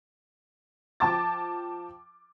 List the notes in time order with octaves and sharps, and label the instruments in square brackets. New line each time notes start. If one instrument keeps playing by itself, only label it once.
[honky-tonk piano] F3 G5 A5 D6 A6